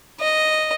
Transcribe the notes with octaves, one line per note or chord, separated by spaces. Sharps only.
D#5